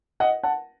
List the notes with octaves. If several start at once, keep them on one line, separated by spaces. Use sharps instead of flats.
D#5 F#5
F#5 A5